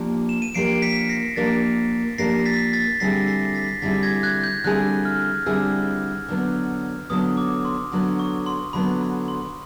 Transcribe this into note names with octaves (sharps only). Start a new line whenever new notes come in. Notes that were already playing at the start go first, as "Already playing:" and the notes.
Already playing: F3 A#3 D4 G4
E7
D#7
F3 A#3 D4 G4 A#4 C7 D7
B6 C#7
A#6 C7
F3 A#3 D4 G4 A#4 A6 B6
F3 A#3 D4 G4 A#4 A#6 C7
A6 B6
A6 B6
D3 G3 C4 E4 G#4 A#6 C7
A#6 C7
A6 B6
D3 G3 C4 E4 G#4 A6 B6
G#6 A#6
F#6 G#6
G6
D3 G3 C4 E4 G#4 F#6
F6
D3 G3 C4 E4 G#4 E6
D3 F#3 B3
D3 F#3 B3 D#6
D6
C6
D3 F#3 B3
C#6
C6
D3 F#3 B3 B5
B5
C6